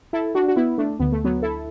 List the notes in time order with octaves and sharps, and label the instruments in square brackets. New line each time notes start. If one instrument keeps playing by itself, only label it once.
[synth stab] E4 A4
D4 F#4
F#4
B3 E4
A3 D4
D2 D3 B3
A3
F#3 B3
E4 A4